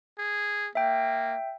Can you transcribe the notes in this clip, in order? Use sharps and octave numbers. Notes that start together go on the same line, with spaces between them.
G#4
A#3 E5 G5